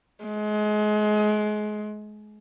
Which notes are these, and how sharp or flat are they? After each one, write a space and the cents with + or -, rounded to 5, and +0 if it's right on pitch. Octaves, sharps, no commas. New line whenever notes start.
G#3 +30